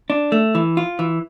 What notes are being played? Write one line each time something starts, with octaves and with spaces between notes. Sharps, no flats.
D4
A3
E3
F4
E3